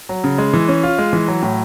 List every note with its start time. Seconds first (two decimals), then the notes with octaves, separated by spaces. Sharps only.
0.09 F#3
0.24 C#3
0.38 G#3
0.53 E3
0.68 C#4
0.83 F4
0.99 G#3
1.13 E3
1.28 F#3
1.42 A2